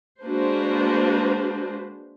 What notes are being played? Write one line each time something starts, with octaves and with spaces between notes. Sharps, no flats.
G#3 A#3 D4 F#4 B4 C5